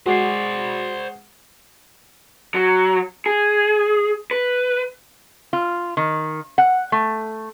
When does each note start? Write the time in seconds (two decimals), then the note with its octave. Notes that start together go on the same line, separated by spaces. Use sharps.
0.06 G#3 F#4 C5 D5 F#5 C7
2.55 F#3
3.26 G#4
4.31 B4
5.53 F4
5.97 D#3
6.58 F#5
6.92 A3